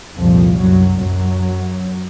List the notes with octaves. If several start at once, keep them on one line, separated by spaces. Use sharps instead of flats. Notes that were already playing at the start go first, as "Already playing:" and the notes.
C2 F2 A#2 F3
F#2 F#3
F#2 F#3